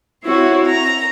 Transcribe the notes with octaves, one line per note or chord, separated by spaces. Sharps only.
C4 E4 F#4 C#5
A#5